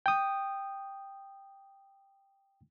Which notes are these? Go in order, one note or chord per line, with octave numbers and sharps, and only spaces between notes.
G5 D#6